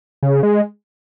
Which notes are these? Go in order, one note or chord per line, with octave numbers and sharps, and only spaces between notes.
C#3
G#3